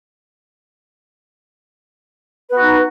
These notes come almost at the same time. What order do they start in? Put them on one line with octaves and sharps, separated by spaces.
B4 B3 F#4 D#4